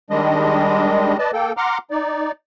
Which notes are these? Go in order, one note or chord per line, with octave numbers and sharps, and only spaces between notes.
D#3 G3 G#3 D4 D#5
B4 D5 D#5 A5
A#3 A4 G5
F#5 A#5 C6 D6 F6
D#4 D5